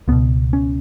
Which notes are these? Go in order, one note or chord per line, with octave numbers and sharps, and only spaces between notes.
C#2 B2 B3
C#4